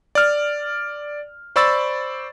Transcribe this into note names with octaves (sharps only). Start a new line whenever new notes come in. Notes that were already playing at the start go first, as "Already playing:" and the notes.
D5 F6
C5 D5 B5 C#6 E6 A6